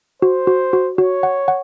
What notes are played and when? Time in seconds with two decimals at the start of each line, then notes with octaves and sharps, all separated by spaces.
0.22 F#4 C5
0.47 F#4
0.73 F#4
0.98 F#4 C#5
1.23 F#5
1.48 F#5